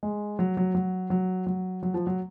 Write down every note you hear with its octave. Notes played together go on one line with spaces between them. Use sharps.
G#3
F#3
F#3
F#3
F#3
F#3
F#3
F3
F#3